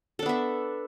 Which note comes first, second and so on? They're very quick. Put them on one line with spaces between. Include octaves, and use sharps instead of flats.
A4 D4 B3 E5